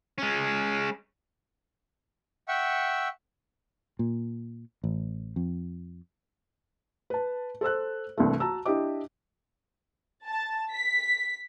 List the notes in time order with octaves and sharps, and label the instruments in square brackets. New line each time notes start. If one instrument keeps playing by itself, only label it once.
[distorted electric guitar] G#3 C#4
[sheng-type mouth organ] E5 F#5 G5 C#6 E6
[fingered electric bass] A#2
A1
F2
[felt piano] B4 A5
A4 C5 E6 F#6
C2 G2 E3 A3
F#4 A5 A#5 E6
D4 E4 G4 D#5 D6
[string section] A5
B6